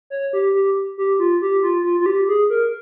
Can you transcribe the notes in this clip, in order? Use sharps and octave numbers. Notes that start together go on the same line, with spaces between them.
C#5
G4
G4
G4
F4
G4
F4
F4
F4
G4
G#4
A#4